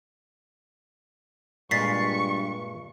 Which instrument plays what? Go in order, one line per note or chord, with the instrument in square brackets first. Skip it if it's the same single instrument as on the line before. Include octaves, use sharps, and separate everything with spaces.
[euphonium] G2 [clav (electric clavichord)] A#2 G#3 F4 [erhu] C#6 [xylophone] A6 B6 C7